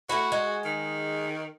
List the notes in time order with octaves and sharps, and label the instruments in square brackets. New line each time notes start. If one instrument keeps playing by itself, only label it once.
[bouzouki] A3 E4 [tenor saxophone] F#4
[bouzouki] G#3
[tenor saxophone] D#3